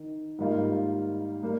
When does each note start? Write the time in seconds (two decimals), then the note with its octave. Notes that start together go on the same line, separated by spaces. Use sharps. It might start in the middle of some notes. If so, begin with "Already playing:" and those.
Already playing: D#3
0.38 G#2 D#3 G3 A#3 F4
1.43 G3 A#3